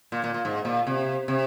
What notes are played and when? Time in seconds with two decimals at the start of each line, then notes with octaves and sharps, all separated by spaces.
0.12 A#2
0.24 A#2
0.34 A#2
0.45 G#2
0.65 A#2
0.87 C3
1.28 C3